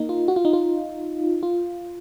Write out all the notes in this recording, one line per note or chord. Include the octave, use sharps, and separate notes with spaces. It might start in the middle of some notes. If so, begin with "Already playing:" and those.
Already playing: A#3 D#4
F4
F#4
F4
D#4
F4
F4